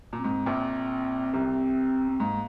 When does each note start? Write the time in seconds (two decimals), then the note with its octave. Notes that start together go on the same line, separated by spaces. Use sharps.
0.13 A#2 C4
0.24 G#2
0.46 A#1 A#2
1.33 C2 C3
2.10 C4
2.20 G#2 A#3